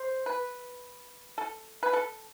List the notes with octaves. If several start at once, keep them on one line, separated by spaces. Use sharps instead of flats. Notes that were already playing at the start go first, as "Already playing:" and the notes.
Already playing: C5
B4
A4
B4
A4